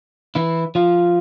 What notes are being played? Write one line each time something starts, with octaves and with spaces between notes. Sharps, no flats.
E3 E4
F3 F4